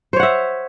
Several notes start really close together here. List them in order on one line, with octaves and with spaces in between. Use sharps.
C5 C#5 F#5 E5